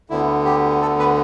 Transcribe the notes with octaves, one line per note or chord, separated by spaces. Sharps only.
D2 D3 B3 E4
G4
A4
B4